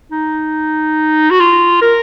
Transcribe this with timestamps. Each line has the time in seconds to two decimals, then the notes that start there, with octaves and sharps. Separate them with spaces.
0.12 D#4
1.31 F#4
1.40 F4
1.82 A#4